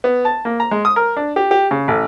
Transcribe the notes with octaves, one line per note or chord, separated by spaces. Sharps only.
B3
A5
A#3
A#5
G#3
D#6
A#4
D4
G4
G4
C#3
A1